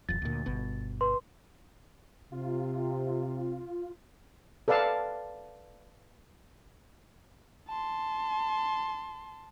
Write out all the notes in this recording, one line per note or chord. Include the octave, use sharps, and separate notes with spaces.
D#1 F2 A6
D2 A#2
G1 B2
B4 C6
C3 F4
A4 B4 D5 F5 A5
A5 C6